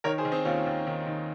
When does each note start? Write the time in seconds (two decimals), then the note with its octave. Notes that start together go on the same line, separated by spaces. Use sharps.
0.04 D#3 A#4 C#5
0.18 G#4 C5
0.25 D#3
0.32 C4 D#4
0.45 D#2 C#4 F4
0.66 D#2
0.87 D#3
1.06 D#3